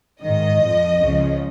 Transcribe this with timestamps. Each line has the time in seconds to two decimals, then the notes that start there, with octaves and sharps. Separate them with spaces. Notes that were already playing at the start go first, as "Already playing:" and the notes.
0.20 G#2 D#3 D#5
0.61 F2 F3
1.00 C#2 C#3 F3